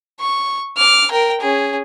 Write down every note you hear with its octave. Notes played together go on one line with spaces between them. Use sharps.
C#6
D6 F6
A#4 G5
C#4 G#4